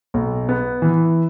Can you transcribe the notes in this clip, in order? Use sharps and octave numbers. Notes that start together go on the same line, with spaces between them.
B1
B3
E3